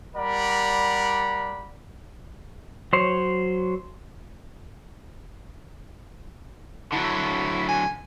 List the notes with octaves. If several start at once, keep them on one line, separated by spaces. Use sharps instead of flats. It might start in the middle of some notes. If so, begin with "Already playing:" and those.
G3 A#4 D5 F#5 B5
F#3 C5 C#5
D3 F#3 E4
G#5